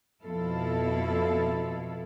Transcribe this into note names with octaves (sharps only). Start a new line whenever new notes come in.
F2 B2 F3 E4 A4 F5